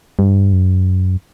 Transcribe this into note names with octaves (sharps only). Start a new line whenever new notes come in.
G2
F#2